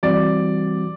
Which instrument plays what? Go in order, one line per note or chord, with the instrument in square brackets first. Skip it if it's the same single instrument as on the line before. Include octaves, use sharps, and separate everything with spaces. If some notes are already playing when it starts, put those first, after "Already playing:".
[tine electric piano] E3 G3 C4 F#4 [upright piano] D5